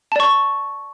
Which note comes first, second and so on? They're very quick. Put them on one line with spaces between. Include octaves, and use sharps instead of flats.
A5 D5 C#6